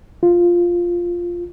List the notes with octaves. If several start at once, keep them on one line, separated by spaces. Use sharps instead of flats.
F4